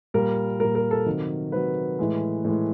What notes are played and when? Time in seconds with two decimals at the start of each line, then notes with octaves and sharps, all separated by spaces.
0.14 A#2 G3 A#4
0.60 A#2 G3 A#4
0.75 A#4
0.91 A4
1.06 C3 D#3 F#3
1.52 C3 D#3 F#3 B4
1.99 A2 E3 G#3
2.45 A2 E3 G#3